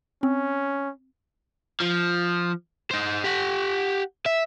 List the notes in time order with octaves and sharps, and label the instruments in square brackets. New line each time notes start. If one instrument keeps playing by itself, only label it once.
[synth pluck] C4 [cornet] C#4
[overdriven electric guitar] F3
D#4 C5
G4 F#5
E5